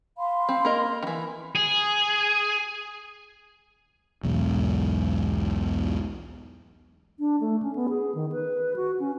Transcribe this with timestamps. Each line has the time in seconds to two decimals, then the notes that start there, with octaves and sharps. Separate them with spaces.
0.18 F5 B5 C6
0.49 C4
0.65 A#3 A#4 D#5
1.03 D#3 E3 B5
1.56 G#4
4.24 B1 E2 G#2
7.19 D4
7.41 A3
7.63 C#4
7.75 B3
7.89 G#4
8.15 D#3
8.32 B4
8.76 F#4
9.00 C#4